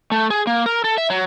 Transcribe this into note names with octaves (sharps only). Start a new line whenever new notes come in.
A3
G#4
A#3
A#4
A4
E5
F#3